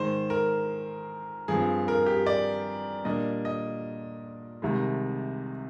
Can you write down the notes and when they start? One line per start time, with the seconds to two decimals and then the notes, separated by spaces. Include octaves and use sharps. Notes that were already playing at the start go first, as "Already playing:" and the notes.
Already playing: G#2 D#3 G#3 C5
0.30 A#4
1.48 G2 F3 C4 G#4
1.88 A#4
2.06 G4
2.27 D5
3.05 A#2 G3 A#3 D4 D#5
3.45 D#5
4.62 C2 C3 D#3 G#3